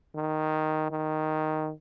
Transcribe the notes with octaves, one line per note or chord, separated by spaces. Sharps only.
D#3
D#3